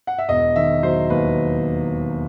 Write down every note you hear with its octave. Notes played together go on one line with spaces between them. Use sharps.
F#5
E5
E1 D#5
D#3 E5
F#3 C5
D#2 B4